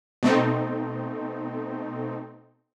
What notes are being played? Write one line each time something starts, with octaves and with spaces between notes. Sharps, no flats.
B2 A3 C4 D#4